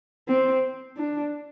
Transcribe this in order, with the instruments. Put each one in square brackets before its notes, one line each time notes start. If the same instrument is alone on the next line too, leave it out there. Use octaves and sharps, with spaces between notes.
[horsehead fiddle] C4
D4